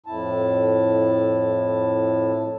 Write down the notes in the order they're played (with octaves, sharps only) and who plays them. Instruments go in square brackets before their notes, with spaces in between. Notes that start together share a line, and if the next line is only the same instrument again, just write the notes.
[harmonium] F2 A2 E4 A5